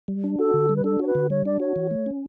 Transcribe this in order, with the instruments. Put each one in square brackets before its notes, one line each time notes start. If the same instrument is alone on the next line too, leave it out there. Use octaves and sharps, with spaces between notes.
[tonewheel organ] G3
D4
[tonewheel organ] F#4 [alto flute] A4
[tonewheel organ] D3
G3
[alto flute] B4
[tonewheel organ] D4 [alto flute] A4
[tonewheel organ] F#4 [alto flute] C#5
[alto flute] B4
[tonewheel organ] D3
[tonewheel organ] G3 [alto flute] C#5
[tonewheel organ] D4 [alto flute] D5
[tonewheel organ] F#4 [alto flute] C#5
[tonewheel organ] E3
A3
C#4